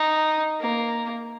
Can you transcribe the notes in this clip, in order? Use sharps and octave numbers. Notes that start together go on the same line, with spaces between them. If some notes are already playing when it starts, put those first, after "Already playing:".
Already playing: D#4
A#3